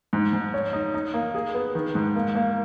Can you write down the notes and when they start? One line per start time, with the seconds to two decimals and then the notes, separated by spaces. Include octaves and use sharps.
0.13 G#2
0.33 G#2
0.54 C#5
0.73 D#4
0.94 D#4
1.14 A#3
1.35 G#4
1.54 B3
1.75 D#3
1.95 G#2
2.16 A#3
2.35 A#3